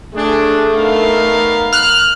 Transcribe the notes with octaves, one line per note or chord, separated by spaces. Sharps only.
A3 D4 G#4
B3 D#4 A#4 F5
F6 F#6